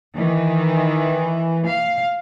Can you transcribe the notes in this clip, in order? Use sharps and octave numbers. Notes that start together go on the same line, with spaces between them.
D#3 E3
F5